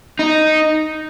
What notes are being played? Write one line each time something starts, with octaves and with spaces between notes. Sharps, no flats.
D#4